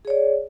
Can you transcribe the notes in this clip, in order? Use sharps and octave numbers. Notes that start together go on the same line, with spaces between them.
G#4 C#5 D5